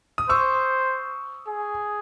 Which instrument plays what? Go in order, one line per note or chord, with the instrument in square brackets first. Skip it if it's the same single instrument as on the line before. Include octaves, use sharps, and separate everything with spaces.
[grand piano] D#6
[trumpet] C5 [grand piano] C#6 E6
[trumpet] G#4